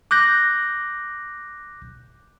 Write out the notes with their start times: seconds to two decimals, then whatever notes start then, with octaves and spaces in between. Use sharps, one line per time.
0.11 D6 F#6 G6 A#6